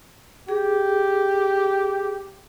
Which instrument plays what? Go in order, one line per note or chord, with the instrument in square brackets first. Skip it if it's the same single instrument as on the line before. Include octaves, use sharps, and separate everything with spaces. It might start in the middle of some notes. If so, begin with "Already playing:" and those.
[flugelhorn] G4 [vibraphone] G#4